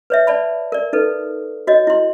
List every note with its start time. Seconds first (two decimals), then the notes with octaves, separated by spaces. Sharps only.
0.10 B4 C#5 E5
0.27 D5 A5 B5
0.72 A#4 D5
0.93 D#4 A4 B4
1.67 F#4 C#5 D#5
1.87 E4 C6